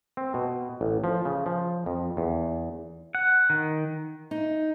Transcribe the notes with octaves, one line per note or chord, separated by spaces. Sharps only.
C4
B2
A1
F3
C#3
F3
F2
E2
F#5
D#3
D#4